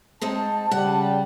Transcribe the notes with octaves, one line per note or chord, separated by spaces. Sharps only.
G#3 C4 D#4 A5
C#3 G3 F#5